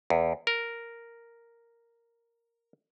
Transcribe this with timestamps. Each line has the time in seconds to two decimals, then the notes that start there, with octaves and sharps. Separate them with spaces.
0.10 E2
0.47 A#4